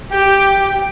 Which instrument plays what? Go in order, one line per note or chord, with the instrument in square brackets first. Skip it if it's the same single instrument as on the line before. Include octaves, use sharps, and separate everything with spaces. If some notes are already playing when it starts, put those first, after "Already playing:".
[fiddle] G4 [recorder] G5